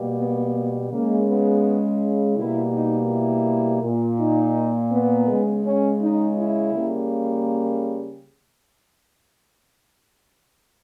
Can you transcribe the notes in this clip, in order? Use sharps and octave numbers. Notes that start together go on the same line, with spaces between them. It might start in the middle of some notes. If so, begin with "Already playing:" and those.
Already playing: B2 G3 A#3
B3
C#3 G#3 A#3
B3
B2 G3 A#3 E4
D#4
E4
A#2 A#3
D#4
B3
C#3 G#3
C#4
D#4
E4
C#3 G3 A#3